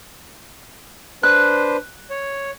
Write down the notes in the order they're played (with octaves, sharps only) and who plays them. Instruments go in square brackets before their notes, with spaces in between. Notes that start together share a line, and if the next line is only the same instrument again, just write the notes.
[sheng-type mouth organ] D4 B4 C5 [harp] F#6
[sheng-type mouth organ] C#5